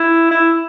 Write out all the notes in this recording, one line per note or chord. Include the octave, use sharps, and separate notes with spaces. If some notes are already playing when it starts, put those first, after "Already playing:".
Already playing: E4
E4